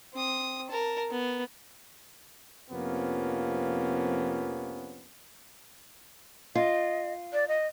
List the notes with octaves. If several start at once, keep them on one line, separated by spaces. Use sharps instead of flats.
C4 D#6
A#4 A5
B3
F2 C3 F3 A#3 B3 C#4
F4 D#5
D5
D#5